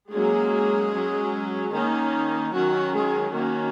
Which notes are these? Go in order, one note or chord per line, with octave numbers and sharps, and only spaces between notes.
F#3 G#3 A#3 C#4 G#4
F#3 C#4
D#3 A#3 C#4 D#4
D#3 F#3 C#4 F#4
G#3 G#4
D#3 A#3 C#4 F#4